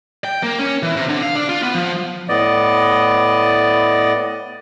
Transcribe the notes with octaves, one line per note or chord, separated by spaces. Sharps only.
G5
A#3
C#4
E3
C3
D3
F5
D4
F4
B3
F3
A2 B3 D5 D#5